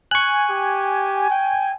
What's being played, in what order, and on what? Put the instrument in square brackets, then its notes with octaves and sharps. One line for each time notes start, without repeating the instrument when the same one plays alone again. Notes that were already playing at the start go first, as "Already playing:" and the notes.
[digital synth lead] G#5 [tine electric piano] C#6 F#6
[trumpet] G4
G5